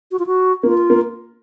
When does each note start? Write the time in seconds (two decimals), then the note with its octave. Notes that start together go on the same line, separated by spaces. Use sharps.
0.11 F#4
0.19 F4
0.27 F#4
0.63 A#3 F4
0.90 A#3